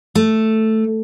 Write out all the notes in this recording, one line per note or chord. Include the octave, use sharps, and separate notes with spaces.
A3